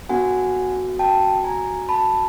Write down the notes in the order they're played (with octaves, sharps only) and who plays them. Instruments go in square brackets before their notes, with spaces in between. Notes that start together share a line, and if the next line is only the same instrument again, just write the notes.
[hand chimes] B3 D4 F#4 A4 F#5 G#5
G5 A5
G#5 A#5
A5 B5